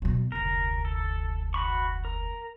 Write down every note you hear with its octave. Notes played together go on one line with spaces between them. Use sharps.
B2 F#3
F1 D2 A#4
A4
F#4 B5 C#6
A#4